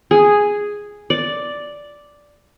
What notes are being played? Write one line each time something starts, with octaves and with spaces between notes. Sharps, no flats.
G#4
D5